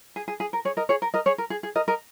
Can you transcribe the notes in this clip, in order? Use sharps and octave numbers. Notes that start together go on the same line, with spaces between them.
G#4
G#4
G#4
A#4
G#4 C#5
A#4 D#5
G#4 C#5
A#4
A#4 D#5
G#4 C#5
A#4
G#4
G#4
A#4 D#5
A#4 D#5